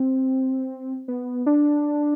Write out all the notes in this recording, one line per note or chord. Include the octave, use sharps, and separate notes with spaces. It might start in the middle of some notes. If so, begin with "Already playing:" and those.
Already playing: C4
B3
D4